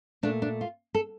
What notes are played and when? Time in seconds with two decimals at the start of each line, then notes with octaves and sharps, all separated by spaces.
0.23 A#2 A3 D4
0.42 D4
0.61 F4
0.94 A4